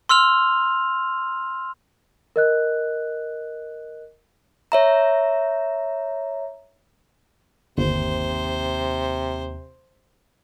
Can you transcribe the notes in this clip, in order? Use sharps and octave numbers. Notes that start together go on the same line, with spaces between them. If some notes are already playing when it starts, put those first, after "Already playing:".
C6 E6 F6 F7
A#4 D#5 F#6
C#5 E5 A#5
G1 D#2 C3 C5